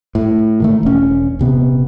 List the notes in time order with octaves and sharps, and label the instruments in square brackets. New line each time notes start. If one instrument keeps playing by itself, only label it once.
[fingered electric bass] A2
D#3 A3
E1 C#4
D#1 C3 B3